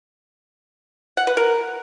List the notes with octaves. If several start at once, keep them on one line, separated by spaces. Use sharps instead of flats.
F#5
B4
A#4